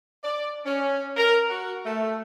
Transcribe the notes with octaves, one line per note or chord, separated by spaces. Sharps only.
D5
C#4
A#4
F#4
A3